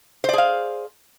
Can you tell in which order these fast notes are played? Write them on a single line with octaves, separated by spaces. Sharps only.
C5 D5 G#4 F5